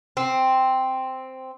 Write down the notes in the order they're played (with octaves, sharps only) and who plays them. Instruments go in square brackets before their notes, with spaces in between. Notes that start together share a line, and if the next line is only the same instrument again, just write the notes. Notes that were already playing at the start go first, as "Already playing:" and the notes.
[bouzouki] C4